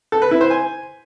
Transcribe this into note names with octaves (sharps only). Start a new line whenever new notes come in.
A4
B4
E4
C5
G#5